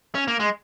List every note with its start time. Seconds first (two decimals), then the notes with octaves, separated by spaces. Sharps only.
0.15 C#4
0.28 A#3
0.40 G#3